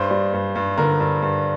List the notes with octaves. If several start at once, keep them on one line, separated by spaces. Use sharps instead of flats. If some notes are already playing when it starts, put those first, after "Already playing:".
Already playing: G2 C5
G3
G2
G2
D3 A#4
G2
G2